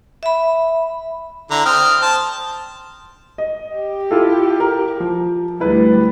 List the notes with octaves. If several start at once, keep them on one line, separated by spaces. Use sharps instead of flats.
E5 B5
D3 E4 A#5
C4 D#6 F6
C5 A5
D#5
G4
E4 F4 A4
A#4
F3
D2 G3 E4 B4